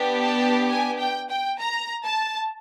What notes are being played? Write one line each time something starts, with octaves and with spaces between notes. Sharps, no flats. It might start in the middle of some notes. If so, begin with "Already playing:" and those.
Already playing: B3 D4 G4
A5
G#5
G5
G5
A#5
A5